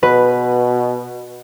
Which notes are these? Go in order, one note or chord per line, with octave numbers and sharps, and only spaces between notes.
B2 B4